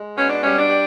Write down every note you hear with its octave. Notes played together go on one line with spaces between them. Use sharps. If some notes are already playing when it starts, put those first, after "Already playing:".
Already playing: G#3
B2 C#4
D4
G3 C#4
D4
G3